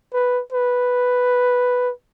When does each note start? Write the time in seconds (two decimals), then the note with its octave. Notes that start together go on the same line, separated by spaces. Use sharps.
0.14 B4
0.53 B4